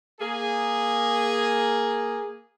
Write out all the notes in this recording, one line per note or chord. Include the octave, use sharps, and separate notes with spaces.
A#3 G#4